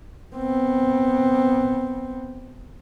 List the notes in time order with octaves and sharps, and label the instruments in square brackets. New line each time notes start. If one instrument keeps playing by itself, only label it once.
[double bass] B3 C4